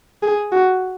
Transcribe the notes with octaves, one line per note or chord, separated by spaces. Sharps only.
G#4
F#4